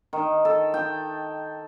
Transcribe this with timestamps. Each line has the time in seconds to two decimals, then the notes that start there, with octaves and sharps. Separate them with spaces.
0.13 D#3
0.45 A4
0.74 G5